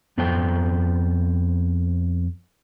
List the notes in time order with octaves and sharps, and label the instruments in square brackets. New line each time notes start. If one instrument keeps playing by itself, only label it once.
[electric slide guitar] F2 B3 F4 A4 C5 G5